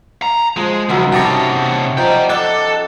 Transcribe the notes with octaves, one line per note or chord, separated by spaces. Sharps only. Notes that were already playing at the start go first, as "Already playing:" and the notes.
A#5
F3 G#3 C5
C#2 F3 G3 B3 D#4 F#4 E5
C3 B3 C#4 G4 C#5 A5 A6 A#6
F3 C5 D5 D#5 G5 A#5
A4 D#5 D6 F#6